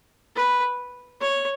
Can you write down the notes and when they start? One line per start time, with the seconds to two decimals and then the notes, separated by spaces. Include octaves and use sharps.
0.36 B4
1.21 C#5